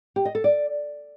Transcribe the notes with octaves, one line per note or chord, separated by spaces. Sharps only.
G4
D#5
A4
D5